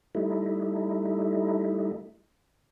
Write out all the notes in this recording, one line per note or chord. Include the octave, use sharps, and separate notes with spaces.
G3 A3 D#4 E4